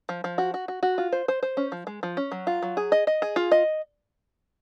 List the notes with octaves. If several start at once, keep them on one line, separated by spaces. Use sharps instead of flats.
F3
F3
F#4
F#4
F#4
F#4
F4
C5
C5
C5
C#4
F3
G#3
F3
C#4
F#3
F4
F#3
G#4
D#5
D#5
G#4
F4
D#5